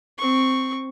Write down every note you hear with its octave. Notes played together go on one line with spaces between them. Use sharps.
C4 C#6